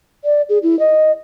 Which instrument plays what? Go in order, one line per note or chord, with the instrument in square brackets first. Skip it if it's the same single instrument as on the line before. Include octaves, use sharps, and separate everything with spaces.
[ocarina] D5
G#4
E4
D#5